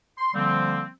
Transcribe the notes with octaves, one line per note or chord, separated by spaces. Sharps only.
C6
D3 F3 G3 A#3 C4